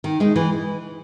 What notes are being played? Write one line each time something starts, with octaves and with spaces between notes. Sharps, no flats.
D#3
G#3 D#4
E3